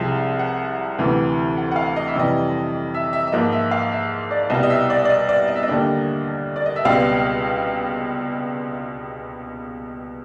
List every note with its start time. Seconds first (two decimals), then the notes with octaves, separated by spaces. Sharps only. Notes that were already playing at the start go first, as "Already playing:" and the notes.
Already playing: C2 C3 F3 G#3
0.39 F#5
0.99 D2 C3 E3
1.58 F#5
1.71 F#5
1.76 F5
1.96 D#5
2.08 E5
2.16 F2 C3 E3 G3 D#5
2.94 E5
3.13 E5
3.27 E5
3.32 G#2 F3 A#3 D#5
3.52 E5
3.71 F5
3.92 E5
4.31 D5
4.50 C2 B2 G3 D#5
4.63 D#5
4.70 E5
4.90 D5
5.05 D5
5.09 D#5
5.29 D5
5.48 D#5
5.56 E5
5.63 D#5
5.68 D#2 D3 G3 A#3 D4
6.56 D5
6.66 D#5
6.76 E5
6.84 C#2 B2 G3 C4 F5